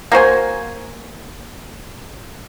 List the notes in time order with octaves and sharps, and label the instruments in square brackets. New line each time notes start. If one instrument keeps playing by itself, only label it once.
[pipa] A#3 F#4 C5 G#5